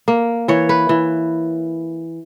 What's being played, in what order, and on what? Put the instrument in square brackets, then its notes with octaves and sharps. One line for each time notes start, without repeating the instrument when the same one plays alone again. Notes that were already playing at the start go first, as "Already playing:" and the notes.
[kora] A#3
E3 C#5
B4
E3